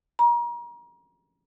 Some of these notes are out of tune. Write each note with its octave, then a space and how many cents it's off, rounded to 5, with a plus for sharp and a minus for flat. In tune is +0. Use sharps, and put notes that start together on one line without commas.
A#5 +35